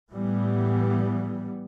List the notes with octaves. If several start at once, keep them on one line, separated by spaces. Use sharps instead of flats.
A2 E3 G3 B3